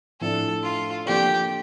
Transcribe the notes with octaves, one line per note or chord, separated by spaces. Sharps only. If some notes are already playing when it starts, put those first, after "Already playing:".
A2 F3 A3 D4 A4
F4
F3 A#3 D4 G4 A4 D5